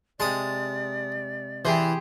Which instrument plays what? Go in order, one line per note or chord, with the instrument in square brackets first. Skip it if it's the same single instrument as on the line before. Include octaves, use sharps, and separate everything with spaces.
[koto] C3 G#3 [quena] D5 [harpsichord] A5 D#6
[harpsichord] E3 [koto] G4 G#4 C5